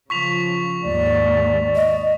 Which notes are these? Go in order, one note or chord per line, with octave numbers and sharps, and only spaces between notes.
C#3 F3 C#6 B6 F7
D#2 G#2 D5
D#5